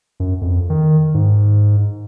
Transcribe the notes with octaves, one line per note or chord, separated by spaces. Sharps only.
F#2
F2
D#3
G#2